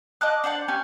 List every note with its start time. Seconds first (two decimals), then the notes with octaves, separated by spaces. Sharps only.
0.21 D#5 A5 D6 F#6
0.44 D4 C5 F#5 A5
0.68 C#4 G4 G#5